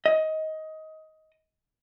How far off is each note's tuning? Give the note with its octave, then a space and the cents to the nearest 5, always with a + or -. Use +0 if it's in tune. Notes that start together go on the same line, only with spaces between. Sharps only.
D#5 +20